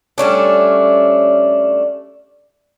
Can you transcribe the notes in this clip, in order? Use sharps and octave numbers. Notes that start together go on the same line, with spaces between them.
G3 A3 C#4 D4